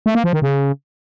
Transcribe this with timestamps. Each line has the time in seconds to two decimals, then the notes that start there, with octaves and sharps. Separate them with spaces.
0.06 A3
0.15 A#3
0.24 F3
0.33 D#3
0.42 C#3